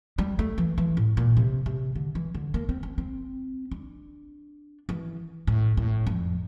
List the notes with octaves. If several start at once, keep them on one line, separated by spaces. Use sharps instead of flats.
G3
A3
E3
E3
A2
A#2
C3
C3
D3
E3
D3
A#3
C4
C4
C4
D4
E3
A2
A2
F2